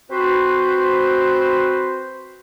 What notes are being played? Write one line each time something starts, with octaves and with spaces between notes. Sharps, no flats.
C4 F#4 B4 C5